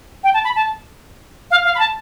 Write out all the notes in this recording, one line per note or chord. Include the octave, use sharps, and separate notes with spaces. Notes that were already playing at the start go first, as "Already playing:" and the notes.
G5
A5
B5
A5
F5
F5
B5
A5